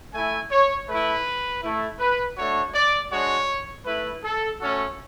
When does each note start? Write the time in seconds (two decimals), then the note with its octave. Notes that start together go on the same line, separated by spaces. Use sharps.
0.13 A3 E4 G#5
0.51 C#5
0.88 A3 E4 B4
1.63 A3 E4
1.99 B4
2.37 A3 D4 F#4 C#5
2.74 D5
3.12 G#3 D4 F#4 C#5
3.86 A3 E4 B4
4.24 A4
4.60 A3 C#4 F#4 A4